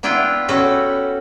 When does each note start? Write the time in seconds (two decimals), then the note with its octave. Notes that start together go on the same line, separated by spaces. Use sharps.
0.03 B3 D4 E4 F4 G5
0.48 C#4 F#4 G4 A4 B4